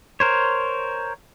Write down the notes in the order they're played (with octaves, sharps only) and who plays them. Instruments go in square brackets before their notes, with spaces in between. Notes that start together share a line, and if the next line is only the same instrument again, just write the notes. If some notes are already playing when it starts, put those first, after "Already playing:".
[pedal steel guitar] A#4 C5 C#5